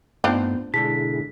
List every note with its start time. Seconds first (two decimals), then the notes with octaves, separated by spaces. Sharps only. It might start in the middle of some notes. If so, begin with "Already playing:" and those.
0.24 G2 A3 B3 C4 D4 D#4 F4 C5
0.74 G#2 B2 D3 E4 G#4 A5 B6